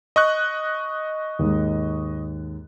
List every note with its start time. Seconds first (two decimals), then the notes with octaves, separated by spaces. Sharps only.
0.16 D#5 C#6 F#6
1.39 D#2 G#2